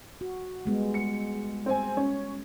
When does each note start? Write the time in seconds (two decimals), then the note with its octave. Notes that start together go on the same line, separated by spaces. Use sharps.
0.21 F#4
0.66 G3 G#3 B3
0.94 C#7
1.66 C4 G#5
1.97 C#4